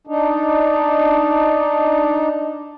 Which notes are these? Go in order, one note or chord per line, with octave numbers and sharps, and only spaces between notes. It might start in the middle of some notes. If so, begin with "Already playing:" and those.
D4 D#4